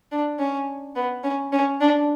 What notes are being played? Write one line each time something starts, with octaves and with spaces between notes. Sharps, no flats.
D4
C#4
B3
C#4
C#4
D4